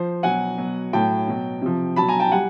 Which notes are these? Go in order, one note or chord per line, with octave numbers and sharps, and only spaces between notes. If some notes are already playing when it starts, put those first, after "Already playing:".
Already playing: F3 C5
B2 F#3 F#5 G#5
B2 F#3
A2 F#3 G5 A5
B2 F#3
C3 F3
B2 F#3 A5 B5
G#5 A#5
G5 A5
G3 F#5 G#5